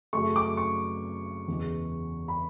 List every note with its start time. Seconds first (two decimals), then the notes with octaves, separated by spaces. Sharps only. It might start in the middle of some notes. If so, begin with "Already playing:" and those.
0.13 F#2 C#3 F#3 A3 C#6
0.36 D6
0.57 C#6
1.48 E2 C#3 G#3
2.28 B5